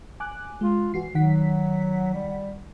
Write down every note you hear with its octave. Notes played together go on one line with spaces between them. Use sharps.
G#5 D6 F#6
G#3 F4
E3 F#4 C7
D#3 F#3 F#5 B6
G3